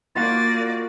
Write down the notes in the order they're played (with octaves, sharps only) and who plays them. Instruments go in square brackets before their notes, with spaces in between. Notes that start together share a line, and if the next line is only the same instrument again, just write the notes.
[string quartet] A#3 D5 [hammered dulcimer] F4 F#4 [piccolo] A6